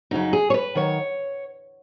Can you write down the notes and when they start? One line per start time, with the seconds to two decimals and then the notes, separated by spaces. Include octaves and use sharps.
0.11 F#2 C#3 F#3 D#4
0.33 G#4
0.50 C#5
0.54 B4
0.75 D#3 F#3 C#5